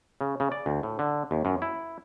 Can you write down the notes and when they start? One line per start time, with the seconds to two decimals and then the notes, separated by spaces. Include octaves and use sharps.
0.21 C#3
0.40 C#3
0.52 D5
0.66 D2
0.83 A2
0.99 D3
1.31 D#2
1.45 F#2
1.62 E4